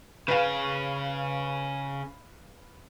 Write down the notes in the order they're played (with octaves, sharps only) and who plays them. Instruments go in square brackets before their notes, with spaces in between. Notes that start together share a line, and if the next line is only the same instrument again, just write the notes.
[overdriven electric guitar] C#3 [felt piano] B4 F5